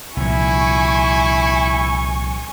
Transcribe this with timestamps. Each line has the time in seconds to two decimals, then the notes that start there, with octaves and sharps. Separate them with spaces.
0.17 C2 A#2 F3 E4 G#5 C#6